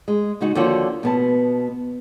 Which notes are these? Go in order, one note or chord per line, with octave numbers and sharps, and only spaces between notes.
G#3
C#3 G#3 D#4 F#4
D#2 D3 F3 A#3 F#4 C#5
B2 B3 A5